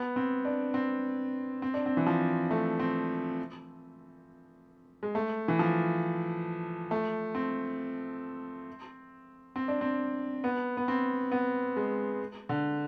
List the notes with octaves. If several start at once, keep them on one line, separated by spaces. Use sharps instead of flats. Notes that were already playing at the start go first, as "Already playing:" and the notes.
Already playing: B3
C4
D4
C4
C4
D4
C4
E3
F3
A3
C4
G#3
A3
E3
F3
A3
C4
C4
D4
C4
B3
B3
C4
B3
G#3
D3